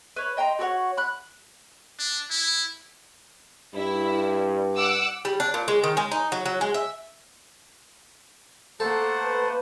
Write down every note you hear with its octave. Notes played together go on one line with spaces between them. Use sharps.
B4 C#5
D#5 G5 A#5 C6
F#4 A4 C#5 F#5
B5 F#6
D4
E4
G2 E4
F#5 D6 E6
G3
D4
A#2
G#3
D#3
G#3
D#4
F#3
F#3
G#3
E5
A3 A#3 A4 C5 F#5 A5
B4